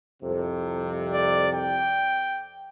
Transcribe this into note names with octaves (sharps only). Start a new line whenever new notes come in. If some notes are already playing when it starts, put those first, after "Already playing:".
C2 F2 C3
D5
G5